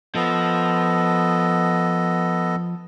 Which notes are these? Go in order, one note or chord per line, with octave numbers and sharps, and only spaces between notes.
F3 B3 A4 D#5